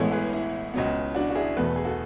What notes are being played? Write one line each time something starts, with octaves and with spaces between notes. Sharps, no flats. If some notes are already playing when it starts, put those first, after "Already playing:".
Already playing: A1 A2 G#3 B3 A4 C#5
G#4 B4
E4
C#2 C#3 F#3 B3
D4 F#4
F#4
E4 G#4
E2 B2 A3 B4
A4
G#4
F#4 A4